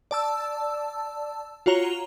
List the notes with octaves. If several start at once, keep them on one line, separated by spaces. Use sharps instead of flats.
D5 A5 E6
F4 F#4 C#5 A#5 F7 G7